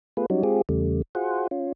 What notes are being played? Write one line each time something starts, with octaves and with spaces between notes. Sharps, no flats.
A3 B3 F4 G#4 B4
F#3 G3 C#4 D#4 F#4
G#3 C4 F4 G4 G#4
E2 C#3 G3 A3
F4 F#4 G#4 C5 F#5
C#4 F4